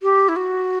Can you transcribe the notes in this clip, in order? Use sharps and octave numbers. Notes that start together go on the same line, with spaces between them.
G4
E4
F#4